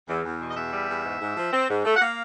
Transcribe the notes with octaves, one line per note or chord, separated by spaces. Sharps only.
E2
E2
B2
D#5
E2 E5
G3
E2
G#2
G#2
F3
C4
G#2
A3
F#5
A#3 F5